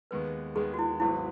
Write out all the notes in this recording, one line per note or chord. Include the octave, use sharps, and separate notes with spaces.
D#2 D#3 G#3 B3 B4
D#2 D#3 G#3 B3 G#4
F#4
E4
G#1 G#2 F#3 B3 E4